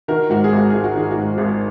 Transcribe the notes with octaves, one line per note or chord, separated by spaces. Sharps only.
D#3 F#4 A#4
G#2 F#4
G#4
G#1
F#4
G#1 G#4
F#4
D#3 G#4
F#4
G#2
G#1 G#4